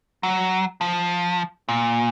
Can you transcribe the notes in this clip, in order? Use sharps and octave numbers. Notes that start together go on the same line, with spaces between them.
F#3
F3
A#2